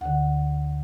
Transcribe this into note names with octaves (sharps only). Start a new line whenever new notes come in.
D2 D3 F#5